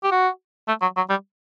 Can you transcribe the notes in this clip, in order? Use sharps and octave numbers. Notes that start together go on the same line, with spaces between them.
G4
F#4
A3
F#3
F#3
G3